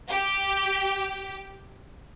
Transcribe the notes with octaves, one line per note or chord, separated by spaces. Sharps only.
G4